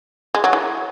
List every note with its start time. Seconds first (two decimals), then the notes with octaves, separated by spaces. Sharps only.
0.34 G#3
0.44 F#3
0.53 E3